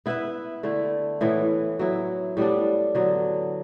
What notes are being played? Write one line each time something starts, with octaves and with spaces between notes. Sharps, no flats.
B3 E4 B4 E5
D3 A3 E4
A2 E3 B3 E4
F#3 B3 E4
A2 G3 B3 D4
D3 F#3 B3